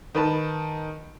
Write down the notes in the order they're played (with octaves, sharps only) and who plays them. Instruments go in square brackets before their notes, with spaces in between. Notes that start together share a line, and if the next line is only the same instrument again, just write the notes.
[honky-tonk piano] D#3 B4 A5